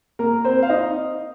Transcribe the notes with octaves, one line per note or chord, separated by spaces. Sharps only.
A#3 A#4
C4 C5
F5
D#4 D#5